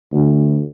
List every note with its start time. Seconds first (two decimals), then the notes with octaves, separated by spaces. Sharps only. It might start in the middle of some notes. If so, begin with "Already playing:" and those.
0.12 D2